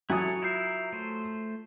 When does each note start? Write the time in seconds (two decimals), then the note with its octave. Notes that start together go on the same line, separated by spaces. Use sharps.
0.10 F#3 E4 A4 C#5 G#5 D#6
0.42 E4 F4 A#4 E5 G6 C7
0.92 A3 C5